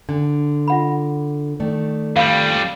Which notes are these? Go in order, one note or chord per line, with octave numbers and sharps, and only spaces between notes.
D3 D4
F4 F#5 B5
D#3 A3 D5
F2 G3 F5 B5